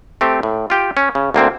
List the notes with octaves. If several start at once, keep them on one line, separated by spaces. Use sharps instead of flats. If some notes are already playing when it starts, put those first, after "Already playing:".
A3 C4 G4
A2
F4 G4 G5
C#4
C#3
D2 A#3 C4